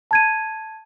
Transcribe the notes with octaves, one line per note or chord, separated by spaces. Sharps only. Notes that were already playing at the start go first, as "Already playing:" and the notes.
A5 G#6 D#7